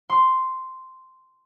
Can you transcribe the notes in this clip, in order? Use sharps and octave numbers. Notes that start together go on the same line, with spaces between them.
C6